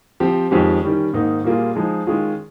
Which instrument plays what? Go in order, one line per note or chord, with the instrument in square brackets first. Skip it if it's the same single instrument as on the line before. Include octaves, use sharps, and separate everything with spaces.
[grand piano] F3 C4 G4
F2 D#3 G#3 C#4 G4
D#3 G3 C#4
G#2 D#3 A#3 D#4
A#2 G3 A#3 F4 G#4
F3 G#3 D#4 G#4
D#3 G#3 C#4 F4 G#4